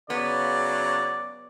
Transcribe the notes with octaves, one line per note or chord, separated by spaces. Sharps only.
C#3 F#3 B3 D5